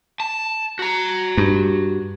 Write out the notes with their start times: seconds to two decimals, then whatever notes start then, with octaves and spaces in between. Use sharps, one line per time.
0.20 A5
0.79 F#4 A#5
1.37 G2